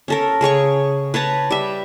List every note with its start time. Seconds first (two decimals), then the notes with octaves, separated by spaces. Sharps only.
0.08 C#4 A4 A#4
0.41 C#3 G#4 C#5 C#6
1.14 B4 C#5 A5 A#5
1.51 G3 E5